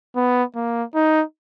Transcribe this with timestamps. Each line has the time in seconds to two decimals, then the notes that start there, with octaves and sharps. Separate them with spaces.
0.16 B3
0.55 A#3
0.95 D#4